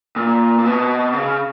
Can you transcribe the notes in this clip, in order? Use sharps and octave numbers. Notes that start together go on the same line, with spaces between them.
A#2
A#2
B2
C#3